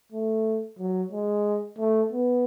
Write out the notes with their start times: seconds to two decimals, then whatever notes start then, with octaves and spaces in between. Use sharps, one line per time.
0.12 A3
0.79 F#3
1.12 G#3
1.78 A3
2.12 B3